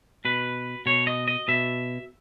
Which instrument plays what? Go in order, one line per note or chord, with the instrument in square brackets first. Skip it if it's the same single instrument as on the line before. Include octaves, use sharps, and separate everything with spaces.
[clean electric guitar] B2 B4
B2 C#5
D#5
D#5
B2 E5